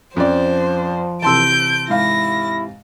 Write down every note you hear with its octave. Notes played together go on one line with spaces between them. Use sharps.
F2 F3 C#4 C5 D5
C3 E3 A5 C6 E6 G6 D7
G#2 E4 F5 A#6